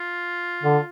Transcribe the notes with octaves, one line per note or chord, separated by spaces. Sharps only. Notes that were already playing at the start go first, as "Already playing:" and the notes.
Already playing: F4
D3